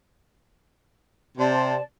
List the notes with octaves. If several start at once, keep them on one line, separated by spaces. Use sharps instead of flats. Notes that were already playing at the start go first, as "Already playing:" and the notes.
C3 C5 D5 A5